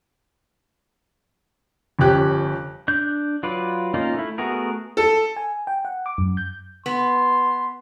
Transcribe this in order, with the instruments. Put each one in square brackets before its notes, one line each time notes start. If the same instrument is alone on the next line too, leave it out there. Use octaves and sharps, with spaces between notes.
[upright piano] G1 F3 C#4 G4 F#6
[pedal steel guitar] D4 G6
F#3 F4 B4 D5
A#3 C#4 D#4 F4
A3 E4
A3 B3 F#4 G#4 A#4
[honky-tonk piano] A4
[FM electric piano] G#5
G5
F#5
D6
F#2
G6
[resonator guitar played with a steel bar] B3 [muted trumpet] C6